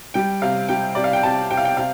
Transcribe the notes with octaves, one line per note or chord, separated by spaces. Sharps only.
G3 G5
C3 F5
G3 G5
C3 D5
F5
G5
C3 A5
C3 G5
F5
G5
C3 F5